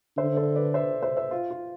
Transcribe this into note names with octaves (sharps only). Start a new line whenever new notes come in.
D3 C5 E5
A4 C5
B4 D5
C5 E5
C5 E5
C5 E5
F4
F4